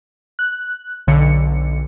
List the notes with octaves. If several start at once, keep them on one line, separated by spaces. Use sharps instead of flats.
F#6
B1 D3 C#7